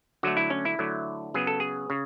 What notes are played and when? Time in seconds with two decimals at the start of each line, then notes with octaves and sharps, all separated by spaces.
0.23 D3 F#3 A3 F#4
0.37 E4
0.50 C#4
0.65 E4
0.79 D3 F#3 A3
1.34 C#3 F#3 B3 G#4
1.47 A4
1.60 G#4
1.90 C#3